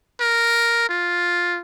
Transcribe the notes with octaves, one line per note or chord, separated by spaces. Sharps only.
A#4
F4